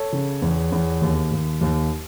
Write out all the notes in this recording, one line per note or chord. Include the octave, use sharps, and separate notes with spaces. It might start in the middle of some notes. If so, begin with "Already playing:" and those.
Already playing: A4 C#5
C#3
E2
E2
D#2
D#2
D#2